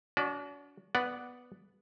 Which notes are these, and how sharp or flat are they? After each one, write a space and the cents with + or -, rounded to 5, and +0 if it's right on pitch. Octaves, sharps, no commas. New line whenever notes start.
D4 -45 F#4 +0 D5 +30
B3 +0 D5 +0 F#5 +0